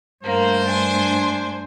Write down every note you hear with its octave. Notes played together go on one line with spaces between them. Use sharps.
G2 A3 A#3 C5
D4 G#5